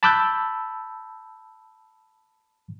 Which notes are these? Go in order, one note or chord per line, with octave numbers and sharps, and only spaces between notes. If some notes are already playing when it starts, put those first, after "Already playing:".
A5 B5 D6 E6 F#6 G6